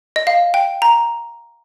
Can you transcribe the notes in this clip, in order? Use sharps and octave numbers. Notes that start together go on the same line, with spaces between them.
D#5
F5
G5
A#5